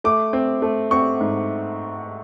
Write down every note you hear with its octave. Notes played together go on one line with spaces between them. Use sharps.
A3 D6
C4
A3
C4 C#6
G#2